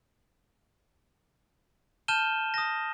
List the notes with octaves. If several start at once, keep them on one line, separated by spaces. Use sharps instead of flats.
A5 F6 G6 D#7 E7 G7
D#6 A#6